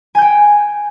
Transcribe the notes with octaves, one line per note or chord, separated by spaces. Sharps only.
G5 G#5 G6